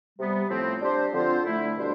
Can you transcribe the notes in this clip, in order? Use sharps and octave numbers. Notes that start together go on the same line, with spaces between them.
C3 G3 B3
A2 F3 A3 C4
G3 D4 G4 C5
D3 F3 C4 F4 C5
D3 A3 E4
B2 G3 D4 A4 C5